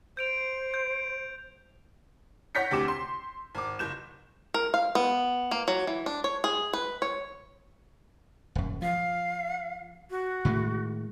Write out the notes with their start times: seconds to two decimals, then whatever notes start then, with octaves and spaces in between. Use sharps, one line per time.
0.17 C5 G6 D7 F7
0.74 G6
2.55 C#5 F#5 G6 A#6 B6 C#7
2.71 D2 C3 D6 E7
2.88 C6
3.55 G#1 D6
3.79 F#1 G6 E7
4.54 A#4
4.74 F5
4.95 B3
5.51 A#3
5.68 F#3
5.87 E3
6.06 D4
6.24 C#5
6.44 G#4
6.73 B4
7.02 C#5
8.55 D#1 F#2
8.82 F3 F5
10.11 F#4
10.45 A2 D#3 G#3